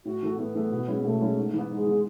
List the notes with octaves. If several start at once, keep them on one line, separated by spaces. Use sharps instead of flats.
A2 F#4
E3 A3
A2 B3
E3 A3
B2
G#3 C#4 E4
B2 A3
G#3 C#4 E4
G#2
E3
B3
G#2 G#3
E3 B3